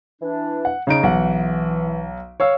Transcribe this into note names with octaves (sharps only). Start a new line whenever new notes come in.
E3 D4
F#5
C#3 D#4 D7
B1 E3 F#5
C#5 F5 E6